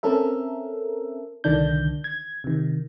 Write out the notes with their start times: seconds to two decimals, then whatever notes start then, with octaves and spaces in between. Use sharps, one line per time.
0.03 C4 C#4 A4 A#4 E5
1.44 C2 D3 D#3 D4 G6
2.04 G#6
2.44 C3 D#3